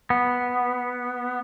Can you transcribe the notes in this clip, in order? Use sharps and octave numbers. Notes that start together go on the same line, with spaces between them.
B3